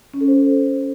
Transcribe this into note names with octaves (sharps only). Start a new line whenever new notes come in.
C#4
A4
C5